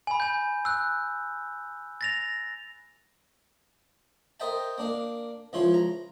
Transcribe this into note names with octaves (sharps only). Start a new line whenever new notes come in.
G#5 B5
G#5 G6
E6 F#6
A6 A#6 F7
A#4 C5 D#5 E5 G5 A5
A#3 D4 F5
C#2 F3 E4 F4 C#5 C6
A#5